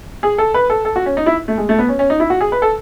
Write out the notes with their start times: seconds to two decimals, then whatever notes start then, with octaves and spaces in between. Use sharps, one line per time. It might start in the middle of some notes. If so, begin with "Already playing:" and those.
0.23 G#4
0.38 A4
0.54 B4
0.70 A4
0.85 A4
0.96 F#4
1.06 C#4
1.17 D#4
1.26 E4
1.48 A3
1.58 G#3
1.69 A3
1.79 B3
1.89 C#4
1.99 C#4
2.10 D#4
2.20 E4
2.30 F#4
2.41 G#4
2.52 B4
2.62 A4